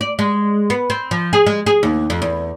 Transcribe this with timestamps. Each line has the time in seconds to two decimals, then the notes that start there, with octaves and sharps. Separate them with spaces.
0.01 D5
0.19 G#3
0.70 B3
0.90 C4
1.11 F3
1.33 G#4
1.46 G#3
1.66 G#4
1.83 D#2
2.10 F2
2.22 E2